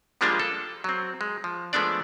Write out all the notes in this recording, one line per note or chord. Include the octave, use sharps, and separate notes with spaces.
F3 G3 G#3 A#3 D4 F4
A4
F#3 C4
G#3
F3
F3 G#3 A3 B3 D4 D5